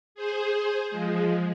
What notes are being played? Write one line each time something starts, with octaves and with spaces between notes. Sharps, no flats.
G#4 C5
F3 G#3